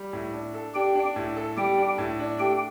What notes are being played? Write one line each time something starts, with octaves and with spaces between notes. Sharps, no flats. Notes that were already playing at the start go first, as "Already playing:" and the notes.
Already playing: G3
A2
D4
A4
D4 G4 G5
D4
A2
A4
G3 G4 G5
D4
A2
D4
A3 G4 G5